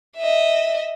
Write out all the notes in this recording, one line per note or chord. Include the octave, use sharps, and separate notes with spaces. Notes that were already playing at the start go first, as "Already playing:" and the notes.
D#5 E5